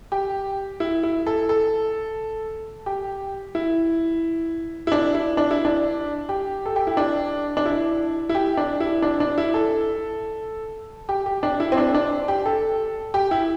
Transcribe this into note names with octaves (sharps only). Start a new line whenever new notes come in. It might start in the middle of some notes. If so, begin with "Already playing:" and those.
G4
E4
E4
A4
A4
G4
E4
E4
D4
E4
D4
E4
D4
G4
A4
G4
E4
D4
D4
E4
E4
G4
D4
E4
D4
D4
E4
A4
G4
G4
D4
E4
C4
D4
D4
G4
A4
G4
E4